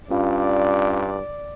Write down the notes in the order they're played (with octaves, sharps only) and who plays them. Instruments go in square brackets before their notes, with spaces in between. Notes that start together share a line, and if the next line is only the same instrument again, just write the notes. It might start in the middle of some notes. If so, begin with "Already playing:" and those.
[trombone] G2 [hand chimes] C#4 F4 F5 [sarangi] D5